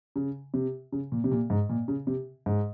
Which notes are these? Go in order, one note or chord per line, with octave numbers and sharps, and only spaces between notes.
C#3
C3
C#3
A#2
C3
A#2
G#2
A#2
C#3
C3
G#2